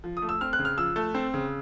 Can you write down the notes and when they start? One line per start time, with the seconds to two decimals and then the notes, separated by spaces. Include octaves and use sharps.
0.04 F3
0.17 D#6
0.22 A3
0.29 E6
0.41 C4 F6
0.53 F#6
0.59 C#3
0.65 F6
0.78 F3 E6
0.96 A3
1.14 C4
1.34 C#3